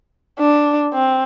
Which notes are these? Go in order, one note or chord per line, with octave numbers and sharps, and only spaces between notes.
D4
C4